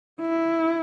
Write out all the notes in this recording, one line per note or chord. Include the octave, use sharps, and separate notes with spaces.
E4